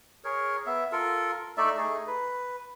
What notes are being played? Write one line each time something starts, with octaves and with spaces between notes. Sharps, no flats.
G#4 A#4 C#5
B3 E5
F4 A4 A#4
A3 D#4 D5 E5
A3 D#4 G#4
B4